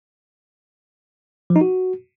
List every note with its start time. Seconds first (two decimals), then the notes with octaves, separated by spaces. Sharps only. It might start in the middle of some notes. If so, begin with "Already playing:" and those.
1.50 F3
1.56 D#4
1.61 F#4